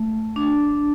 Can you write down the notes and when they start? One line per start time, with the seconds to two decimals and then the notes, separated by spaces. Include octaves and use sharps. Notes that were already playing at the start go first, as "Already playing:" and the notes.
Already playing: A3
0.36 D4